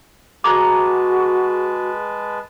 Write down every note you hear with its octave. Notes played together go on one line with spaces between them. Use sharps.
G#3 F#4 G#4 B4 A5 A#5 D6 F#6